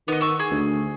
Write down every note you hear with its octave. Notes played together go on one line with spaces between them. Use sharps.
D#3 B3 D#5
C#6 E6
G#4
D2